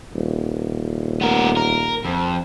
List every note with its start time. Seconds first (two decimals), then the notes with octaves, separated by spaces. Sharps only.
0.15 D#1
1.21 B3 A#4
1.57 A#4
2.05 F2